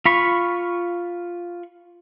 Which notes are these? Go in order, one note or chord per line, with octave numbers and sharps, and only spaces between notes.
F4 B5 C#6